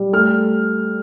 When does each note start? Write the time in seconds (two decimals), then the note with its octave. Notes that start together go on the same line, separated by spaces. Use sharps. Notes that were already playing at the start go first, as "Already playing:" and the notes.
Already playing: G3
0.13 A3 F6